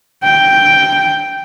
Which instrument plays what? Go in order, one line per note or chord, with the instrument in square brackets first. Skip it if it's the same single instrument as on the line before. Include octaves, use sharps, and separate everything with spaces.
[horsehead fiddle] G5